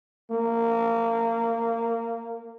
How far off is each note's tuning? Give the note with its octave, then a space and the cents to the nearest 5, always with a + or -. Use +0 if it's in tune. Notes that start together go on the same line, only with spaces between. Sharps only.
A#3 -20